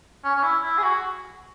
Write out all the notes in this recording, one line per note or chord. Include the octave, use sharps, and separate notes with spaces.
C#4
C#4
E4
E4
G#4
F#4